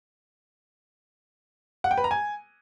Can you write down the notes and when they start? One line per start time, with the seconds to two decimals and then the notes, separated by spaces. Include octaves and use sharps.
1.84 F#5
1.91 G5
1.97 B4
2.04 A#5
2.11 G#5